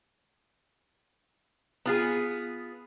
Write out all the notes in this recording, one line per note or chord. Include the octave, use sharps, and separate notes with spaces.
B3 F4 G#4